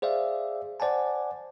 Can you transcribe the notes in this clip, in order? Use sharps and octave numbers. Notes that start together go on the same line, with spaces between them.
G#4 C5 D5 E5 F5
C5 D5 F#5 G#5 A5